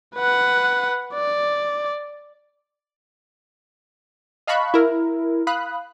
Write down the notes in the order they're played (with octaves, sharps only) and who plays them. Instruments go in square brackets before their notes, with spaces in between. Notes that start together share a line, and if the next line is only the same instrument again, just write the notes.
[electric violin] B4 F#5
D5
[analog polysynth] D#5 F5 A5 B5 C#6 F#6
E4 A#4
F5 B5 D#6 F#6